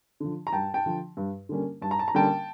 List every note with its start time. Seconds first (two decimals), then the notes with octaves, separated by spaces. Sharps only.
0.20 D3 F3
0.47 A#5
0.53 G2 G5 A5
0.74 G5 A5
0.86 D3 F3
1.17 G2
1.49 D3 G3 A#3 C#4
1.82 G2 A5
1.91 A#5
1.99 A5
2.08 A#5
2.14 D3 G3 A#3 C#4 G5 A5